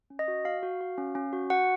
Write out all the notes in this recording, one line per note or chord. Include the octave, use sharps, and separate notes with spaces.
C#4
D#5
F#4
F#4 F5
F#4
F#4
C#4
C#4
F#4
F#4 F#5